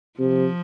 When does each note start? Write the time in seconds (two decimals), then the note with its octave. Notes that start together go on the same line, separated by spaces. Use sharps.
0.19 C3 F3